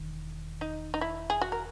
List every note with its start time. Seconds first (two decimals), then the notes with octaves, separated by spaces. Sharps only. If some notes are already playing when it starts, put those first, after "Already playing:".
Already playing: E1 E2 D#3
0.61 D#4
0.94 D#4
1.01 E4
1.30 G#4
1.42 F#4
1.52 A#4